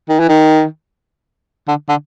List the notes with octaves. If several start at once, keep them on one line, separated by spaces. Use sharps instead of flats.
D#3
E3
D#3
D3
D3